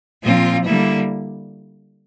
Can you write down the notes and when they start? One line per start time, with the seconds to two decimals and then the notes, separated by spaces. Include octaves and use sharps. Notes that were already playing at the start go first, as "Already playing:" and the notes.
0.23 A#2 F3 C4 F4
0.64 D3 G3 A#3 E4